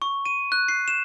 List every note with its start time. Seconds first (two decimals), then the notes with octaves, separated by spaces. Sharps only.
0.02 C#6
0.25 D#7
0.52 F#6
0.68 C7
0.88 E7